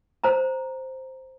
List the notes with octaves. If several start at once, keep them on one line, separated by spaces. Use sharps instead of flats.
C5 A#5